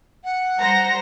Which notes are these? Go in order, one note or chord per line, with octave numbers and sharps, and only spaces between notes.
F#5
G3 C5 A#5 A#6